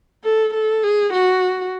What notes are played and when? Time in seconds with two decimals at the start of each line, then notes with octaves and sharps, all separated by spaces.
0.24 A4
0.54 A4
0.84 G#4
1.13 F#4